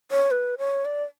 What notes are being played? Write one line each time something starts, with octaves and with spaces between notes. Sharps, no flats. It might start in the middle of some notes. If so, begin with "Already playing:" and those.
C#5
B4
C#5
D5